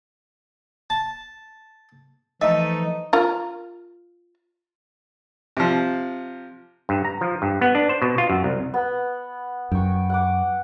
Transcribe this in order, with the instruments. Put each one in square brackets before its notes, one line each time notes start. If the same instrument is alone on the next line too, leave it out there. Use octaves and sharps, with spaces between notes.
[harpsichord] A5
[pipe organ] E3 F3 [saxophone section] A3 D#4 [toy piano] D#5 [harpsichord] E5
[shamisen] F4 A#4
[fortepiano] C3 F3
[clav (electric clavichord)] G2
A#5
F3
G2
B3
D4
C5
B2
F4
F#2
C2
[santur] B3
[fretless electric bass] F#2 [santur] G5 C#6
[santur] F#5 D6